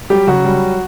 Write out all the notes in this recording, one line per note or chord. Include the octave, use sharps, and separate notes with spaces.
F#3 G3 G4
C#3 F#3 F#4
G3